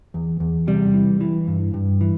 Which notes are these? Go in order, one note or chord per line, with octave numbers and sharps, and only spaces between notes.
E2
E2
C3 G3
E3
E3
G2
G2
E3